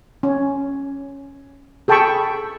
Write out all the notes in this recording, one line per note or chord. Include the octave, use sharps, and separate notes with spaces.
C#4
G#4 A4 G5 A5 B5 C#6